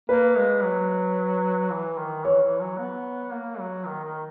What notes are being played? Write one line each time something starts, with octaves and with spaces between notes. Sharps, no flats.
A#3 B4
G#3
F#3
E3
D#3
E3 C#5
E3
F#3
B3
A#3
F#3
D#3
D#3